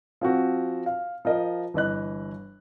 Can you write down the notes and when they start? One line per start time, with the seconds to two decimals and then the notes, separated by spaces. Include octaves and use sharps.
0.21 F3 C4 F#4
0.86 F5
1.25 F3 A#4 D#5
1.74 G1 E3 D#5 F#6